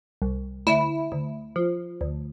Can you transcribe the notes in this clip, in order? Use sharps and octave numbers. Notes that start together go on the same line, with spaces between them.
C2
D2 E4
D2
F3
D2